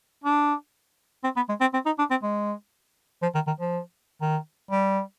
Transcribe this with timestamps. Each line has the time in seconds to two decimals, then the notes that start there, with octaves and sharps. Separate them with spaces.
0.24 D4
1.24 C4
1.36 B3
1.49 G#3
1.61 C4
1.74 C4
1.86 D#4
1.99 D4
2.11 C4
2.23 G#3
3.22 F3
3.35 D#3
3.47 D#3
3.60 F3
4.22 D#3
4.71 G3